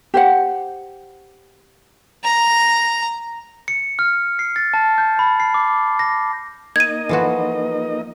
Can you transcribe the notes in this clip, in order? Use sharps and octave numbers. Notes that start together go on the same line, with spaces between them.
G4 C5 F#5
A#5
C#7
F6
C7
A6
A5
G6
B5
C7
D6
A#6
A#3 D#4 D#5 G#6 D#7
E3 F3 F4 F#4 A4 B4